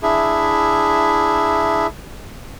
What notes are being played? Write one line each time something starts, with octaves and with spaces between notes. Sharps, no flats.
D4 E4 G#4 E5